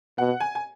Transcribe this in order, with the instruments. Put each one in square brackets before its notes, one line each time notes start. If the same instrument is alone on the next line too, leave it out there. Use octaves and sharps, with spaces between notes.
[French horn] B2 [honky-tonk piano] F#5
[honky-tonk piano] G#5
G#5